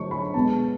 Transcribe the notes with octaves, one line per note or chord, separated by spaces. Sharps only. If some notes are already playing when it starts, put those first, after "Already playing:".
Already playing: D3 F#3 A3 C#6
B5
B2 G#3 B3 A5